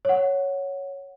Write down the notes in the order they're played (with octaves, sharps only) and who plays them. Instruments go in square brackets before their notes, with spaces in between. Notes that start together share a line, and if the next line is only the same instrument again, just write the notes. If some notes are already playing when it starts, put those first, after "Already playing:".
[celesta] C#5 F#5